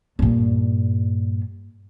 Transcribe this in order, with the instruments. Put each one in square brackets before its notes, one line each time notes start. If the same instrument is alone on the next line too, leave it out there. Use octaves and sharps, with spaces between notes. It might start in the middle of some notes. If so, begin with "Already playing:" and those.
[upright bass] G2 A#2